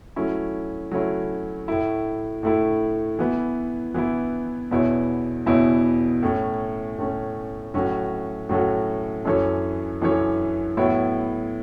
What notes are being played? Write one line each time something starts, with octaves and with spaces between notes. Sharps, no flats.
F#3 A3 C#4 E4
F#3 A3 C#4 E4
A2 A3 E4
A2 A3 E4
E3 B3 E4
E3 B3 E4
E2 B2 B3 E4 C#5
E2 B2 B3 E4 C#5
A2 A3 C#4
A2 A3 C#4
A2 F#3 C#4 F#4 A4
A2 F#3 C#4 F#4 A4
F#2 E3 C#4 A4 C#5
F#2 E3 C#4 A4 C#5
A2 F#3 B3 E4 C#5